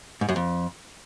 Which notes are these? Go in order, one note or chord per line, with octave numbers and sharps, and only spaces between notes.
G#2
F#2
F2